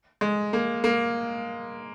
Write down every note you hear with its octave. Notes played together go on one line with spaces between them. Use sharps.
G#3
A#3
A#3